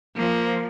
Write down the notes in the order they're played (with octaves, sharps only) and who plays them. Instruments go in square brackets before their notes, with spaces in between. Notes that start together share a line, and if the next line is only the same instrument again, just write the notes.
[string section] F3 [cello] A#3